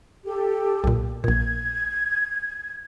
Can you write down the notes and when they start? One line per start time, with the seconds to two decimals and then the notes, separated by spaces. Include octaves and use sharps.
0.25 G4 A4
0.84 B1 A#2
1.24 A#1 A#2 G#6